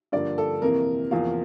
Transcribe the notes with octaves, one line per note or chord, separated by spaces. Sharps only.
G2 D3 F3 A#3 D5
A4
F2 C3 E3 A#3 A#4
E2 C3 F3 A#3 F5